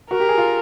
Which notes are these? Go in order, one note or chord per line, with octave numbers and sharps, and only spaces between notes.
F#4 A#4
G4
G#4
F4